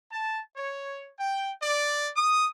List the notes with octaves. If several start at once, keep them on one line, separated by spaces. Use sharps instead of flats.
A5
C#5
G5
D5
D#6